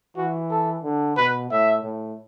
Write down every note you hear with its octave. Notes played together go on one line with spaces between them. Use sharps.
E3 F#4
A4
D3
B2 B4
A2 E5
A2